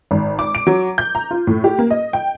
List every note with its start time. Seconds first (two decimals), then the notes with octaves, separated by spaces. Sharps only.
0.11 G#1
0.39 D6
0.55 D7
0.67 F#3
0.98 G6
1.15 A#5
1.31 F4
1.47 A2
1.64 G4
1.79 A#3
1.90 D#5
2.13 G5